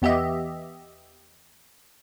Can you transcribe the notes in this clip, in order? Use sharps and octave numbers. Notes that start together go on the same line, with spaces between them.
E2 B3 G4 D#5 E5